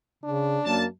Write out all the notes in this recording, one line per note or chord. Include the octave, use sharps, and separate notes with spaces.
C#3 D4
F#2 A#3 A5